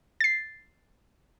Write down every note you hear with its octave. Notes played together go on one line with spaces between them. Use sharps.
A6 C7